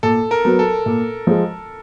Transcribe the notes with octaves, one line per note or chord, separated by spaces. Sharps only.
A#2 A4
A#4
F#3 B3
A4
A#2
F3 G#3